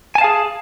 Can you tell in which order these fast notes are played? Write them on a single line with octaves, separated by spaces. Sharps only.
G#5 A5 F5 G#4